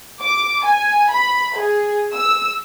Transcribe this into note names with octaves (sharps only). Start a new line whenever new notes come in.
D6
G#5
B5
G#4
E6